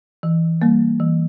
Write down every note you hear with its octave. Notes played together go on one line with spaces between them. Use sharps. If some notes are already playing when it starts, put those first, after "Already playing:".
E3
G3 A#3
E3